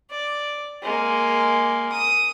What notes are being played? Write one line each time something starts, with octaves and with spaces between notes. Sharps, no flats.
D5
G#3 A#3
D#6